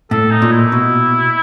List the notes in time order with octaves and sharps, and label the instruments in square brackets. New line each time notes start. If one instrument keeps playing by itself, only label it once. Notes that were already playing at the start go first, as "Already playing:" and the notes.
[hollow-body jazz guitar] A2 [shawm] A4
[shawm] D#4
[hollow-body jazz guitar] A#2
[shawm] E4
[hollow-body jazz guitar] B2